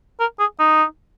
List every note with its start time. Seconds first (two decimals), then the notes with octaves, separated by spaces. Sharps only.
0.20 A#4
0.39 G#4
0.59 D#4